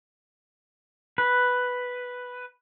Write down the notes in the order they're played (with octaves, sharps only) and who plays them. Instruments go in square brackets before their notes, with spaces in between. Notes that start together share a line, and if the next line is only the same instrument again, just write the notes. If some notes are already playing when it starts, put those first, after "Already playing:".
[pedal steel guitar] B4